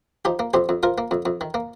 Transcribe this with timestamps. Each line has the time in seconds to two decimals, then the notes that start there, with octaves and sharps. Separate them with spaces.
0.25 F3 D#4 G4
0.39 A#3
0.54 F2 G4 C5
0.69 F2
0.83 F3 F4 A#4
0.98 A#3
1.11 F2
1.26 F2
1.41 D#3
1.54 A#3